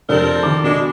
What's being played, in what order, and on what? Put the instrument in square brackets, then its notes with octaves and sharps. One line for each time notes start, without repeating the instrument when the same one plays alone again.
[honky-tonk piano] F2 C3 D4 [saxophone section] C4 A4 A#4
[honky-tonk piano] D#3 D6
[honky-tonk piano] B2 [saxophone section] G#3 D4